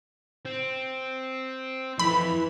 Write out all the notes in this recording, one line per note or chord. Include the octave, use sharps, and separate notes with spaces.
C4
F2 E3 B5